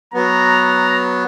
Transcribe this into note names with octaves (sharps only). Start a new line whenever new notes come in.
F#3 B3 A#5